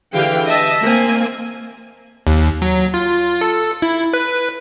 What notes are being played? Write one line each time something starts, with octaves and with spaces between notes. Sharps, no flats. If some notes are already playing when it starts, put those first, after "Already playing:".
D3 E3 G4 G#4 F5 G5
D#5 E5 A5
A#3 C4 G#5
D#2
F#3
F4
A4
E4
B4